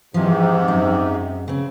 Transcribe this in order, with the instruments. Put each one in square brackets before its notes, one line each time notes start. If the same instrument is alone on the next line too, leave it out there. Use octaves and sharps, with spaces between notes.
[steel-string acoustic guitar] F2 E3 F3 [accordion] G#2 C3
[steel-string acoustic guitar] F#2 G#3
C#3 C4